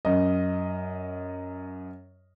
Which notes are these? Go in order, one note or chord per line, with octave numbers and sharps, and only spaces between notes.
F#2 D#5